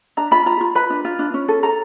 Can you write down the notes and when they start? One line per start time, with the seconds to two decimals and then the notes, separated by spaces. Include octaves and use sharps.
0.17 D4 A#5
0.31 F4 B5
0.46 F4 A#5
0.61 F4
0.75 B4 B5
0.90 D4
1.05 F4
1.19 D4
1.34 C#4
1.48 A4
1.63 A4 A#5